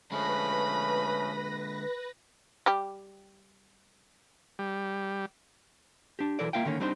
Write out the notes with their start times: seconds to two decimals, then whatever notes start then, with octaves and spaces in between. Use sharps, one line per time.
0.12 D3 F3 G#3 A3 C#4 B4 B5 A#6
2.66 G3 G4
4.59 G3
6.19 D4 G4
6.39 B1 A#2 E3 A4 A#4 D5
6.53 A#3 F4 E5 F5 G5
6.65 D3 D#3 A#3 C#4
6.80 G3 C4 D4 D#4 C5